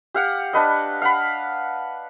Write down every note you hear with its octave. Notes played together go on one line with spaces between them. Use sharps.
G4 F5 F#5
D4 B4 D#5
F5 F#5 B5